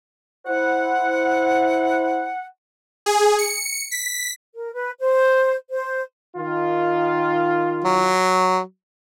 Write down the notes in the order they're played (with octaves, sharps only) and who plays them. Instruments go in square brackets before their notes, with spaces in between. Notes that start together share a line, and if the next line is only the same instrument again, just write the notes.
[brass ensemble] E4 C5 [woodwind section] F#5
[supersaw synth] G#4
C#7
B6
[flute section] A#4
B4
C5
C5
[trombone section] D#3 F4
[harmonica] F#3